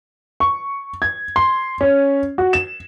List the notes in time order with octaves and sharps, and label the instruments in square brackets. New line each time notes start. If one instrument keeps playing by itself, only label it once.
[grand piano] C#6
G#6
C6
C#4
F#4
E7